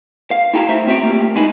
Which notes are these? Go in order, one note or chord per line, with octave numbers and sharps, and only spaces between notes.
F5
E4 F#4 G#4 G5 A5 A#5
A3 C5 E5
C4 F#4 C5 E5 G5 A#5
A3 A#3 F4 G4
B2 G#3 D#4 E4 G#4 B4